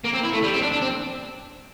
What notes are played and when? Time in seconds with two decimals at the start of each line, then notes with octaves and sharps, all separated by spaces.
0.04 A#3
0.13 C4
0.24 E4
0.33 A3
0.43 G3
0.53 C4
0.62 D4
0.72 D4
0.82 C4